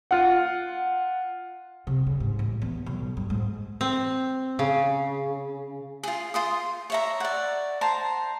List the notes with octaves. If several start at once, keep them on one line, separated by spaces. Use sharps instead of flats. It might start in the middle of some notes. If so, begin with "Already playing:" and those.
F4 F#5
C3
C#3
G#2
A1
E2
B1
G2
G#2
C4
C#3
F4 G#4
F4 C6 D#6
C#5 E5 A#5
D5 F#5
C5 A5 A#5